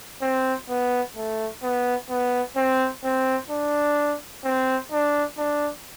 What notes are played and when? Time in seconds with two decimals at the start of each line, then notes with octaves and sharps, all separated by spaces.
0.22 C4
0.69 B3
1.16 A3
1.63 B3
2.09 B3
2.56 C4
3.04 C4
3.50 D4
4.44 C4
4.91 D4
5.38 D4